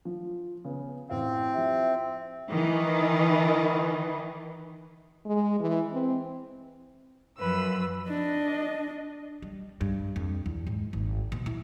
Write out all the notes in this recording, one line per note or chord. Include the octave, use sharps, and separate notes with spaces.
F3
C#3 B3
A1 C4 F5
F3 G4 E5
D#3 E3
G#3
E3
C4
F#2 F3 B4 E6
D4 D#5
G3
G2
F2
E2
G#2
G#1
B2
E3